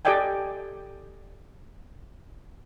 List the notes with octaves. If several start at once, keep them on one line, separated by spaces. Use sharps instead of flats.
G4 A4 D5 D#5 G5 G#5